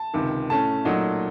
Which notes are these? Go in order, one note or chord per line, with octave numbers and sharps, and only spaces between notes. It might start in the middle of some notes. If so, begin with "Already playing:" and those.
Already playing: A5
C#2 C3 D#3
A2 A3 C#4 A5
A#2 F#3 A3 D#4